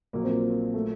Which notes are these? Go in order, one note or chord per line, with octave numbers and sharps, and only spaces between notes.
A#1 A#2 F#3 A#3
C4
A#3
A3